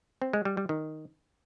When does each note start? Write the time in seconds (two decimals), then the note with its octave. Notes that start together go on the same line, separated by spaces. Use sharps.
0.22 C4
0.33 G#3
0.45 G3
0.57 G3
0.69 D#3